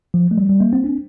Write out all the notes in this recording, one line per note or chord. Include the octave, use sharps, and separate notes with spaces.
F3
A3
G3
G3
A#3
C4
D4